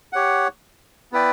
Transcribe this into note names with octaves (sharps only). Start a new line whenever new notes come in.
G4 C#5 F#5
B3 E4 B4 D5 G5